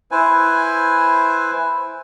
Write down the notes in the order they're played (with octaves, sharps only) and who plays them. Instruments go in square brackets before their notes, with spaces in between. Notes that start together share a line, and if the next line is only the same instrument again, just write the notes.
[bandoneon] E4 B4 C5 G#5